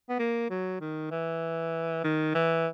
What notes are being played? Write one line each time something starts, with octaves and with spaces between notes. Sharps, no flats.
B3
A#3
F#3
D#3
E3
D#3
E3